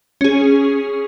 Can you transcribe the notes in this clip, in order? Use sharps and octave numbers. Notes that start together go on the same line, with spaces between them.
C#4 G#4